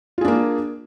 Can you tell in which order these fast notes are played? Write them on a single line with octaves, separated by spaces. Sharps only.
F4 G#4 D4 A#3